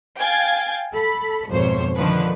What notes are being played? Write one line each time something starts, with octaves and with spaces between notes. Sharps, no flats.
F5 G5 G#5 G#6 A6
A4 B5
G#1 F2 B2 C5 C#5
D3 D#3 F3 B4